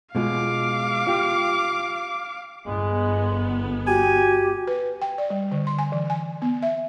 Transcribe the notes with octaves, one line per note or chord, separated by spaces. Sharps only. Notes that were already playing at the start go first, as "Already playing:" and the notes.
B2 G#3 F4 F5 D6
F4 G4
G1 G#3 B3
F#4 G4 G#5
B4
G5
D5
G3
D3
C6
G#5
E3
G#5
B3
E5